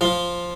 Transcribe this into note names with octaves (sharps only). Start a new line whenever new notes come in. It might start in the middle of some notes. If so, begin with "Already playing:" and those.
F3 F4